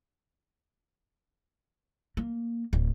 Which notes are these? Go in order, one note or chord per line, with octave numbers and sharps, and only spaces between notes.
A#3
D1